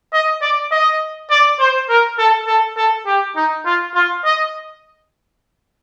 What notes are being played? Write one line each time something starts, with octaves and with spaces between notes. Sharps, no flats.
D#5
D5
D#5
D5
C5
A#4
A4
A4
A4
G4
D#4
F4
F4
D#5